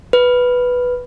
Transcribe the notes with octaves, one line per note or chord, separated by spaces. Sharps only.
B4